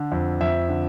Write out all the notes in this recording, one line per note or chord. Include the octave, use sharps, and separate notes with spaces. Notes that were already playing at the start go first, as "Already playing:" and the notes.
Already playing: D3
F2
F2 E5
D3